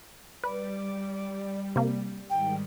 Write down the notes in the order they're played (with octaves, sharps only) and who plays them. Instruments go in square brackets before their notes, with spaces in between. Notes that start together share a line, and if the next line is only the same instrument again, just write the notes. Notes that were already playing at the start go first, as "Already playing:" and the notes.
[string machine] G3 [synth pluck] B4 [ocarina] D5
[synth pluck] C3 A#3
[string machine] G#2 D#3 G3 [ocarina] G5